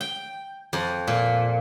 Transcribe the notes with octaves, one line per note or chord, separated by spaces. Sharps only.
G5
F2
A#2